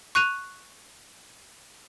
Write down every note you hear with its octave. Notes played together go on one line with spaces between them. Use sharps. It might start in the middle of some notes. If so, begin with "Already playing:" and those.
C#6 F#6 D#7 F7